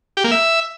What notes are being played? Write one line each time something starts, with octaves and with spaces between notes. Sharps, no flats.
G4
A#3
E5